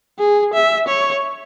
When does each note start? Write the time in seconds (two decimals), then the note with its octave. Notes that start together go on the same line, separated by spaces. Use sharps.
0.19 G#4
0.54 E5
0.88 C#5